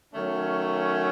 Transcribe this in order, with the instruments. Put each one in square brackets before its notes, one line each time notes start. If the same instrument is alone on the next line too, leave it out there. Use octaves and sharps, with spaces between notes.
[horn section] D#3 F#3 A3 C#4